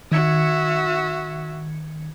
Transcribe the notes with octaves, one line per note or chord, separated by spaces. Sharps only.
D#3 F#4 E5 G#6 C#7